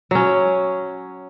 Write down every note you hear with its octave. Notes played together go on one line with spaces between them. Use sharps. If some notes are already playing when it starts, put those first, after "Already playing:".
F#3 C#4